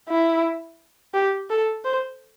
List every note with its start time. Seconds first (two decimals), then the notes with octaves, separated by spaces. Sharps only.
0.09 E4
1.14 G4
1.50 A4
1.85 C5